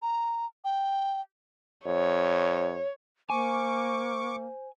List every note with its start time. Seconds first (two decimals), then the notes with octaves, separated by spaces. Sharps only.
0.02 A#5
0.64 G5
1.86 F2 C#5
3.30 A#3 C5 G#5 C#6 D6